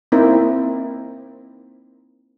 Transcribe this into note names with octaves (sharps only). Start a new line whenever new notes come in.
A#3 C4 D#4 E4 A#4